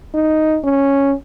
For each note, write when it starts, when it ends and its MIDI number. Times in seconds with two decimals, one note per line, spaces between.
0.14 0.58 63
0.64 1.13 61